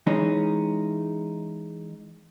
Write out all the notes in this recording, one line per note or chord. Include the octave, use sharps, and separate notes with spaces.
E3 G#3 C#4 D#4